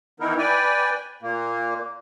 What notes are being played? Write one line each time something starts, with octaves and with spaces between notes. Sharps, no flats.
D#3 E3 B3 D#4 E4 A#4
B4 D5 G5 G#5
A#2 A#3